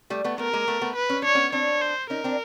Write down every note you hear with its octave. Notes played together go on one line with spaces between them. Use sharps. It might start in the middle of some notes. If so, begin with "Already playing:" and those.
G3 A3
A3 B3
A3 B3 A#4
G#3 A#3
A3 B3
A3 B3
B4
C#4
D4 C#5
B3 C#4
C4 D4 C#5
C5
C#4 D#4 A#4
C4 D4